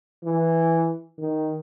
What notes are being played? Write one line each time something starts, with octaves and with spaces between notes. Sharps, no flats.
E3
D#3